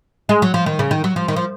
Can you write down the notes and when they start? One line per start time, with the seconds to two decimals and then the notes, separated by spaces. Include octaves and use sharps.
0.29 G#3
0.42 F#3
0.54 F3
0.66 D#3
0.79 C#3
0.91 D#3
1.04 F#3
1.16 F3
1.28 D#3
1.36 F3